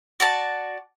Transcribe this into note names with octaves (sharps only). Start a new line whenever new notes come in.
F#4 D5 A5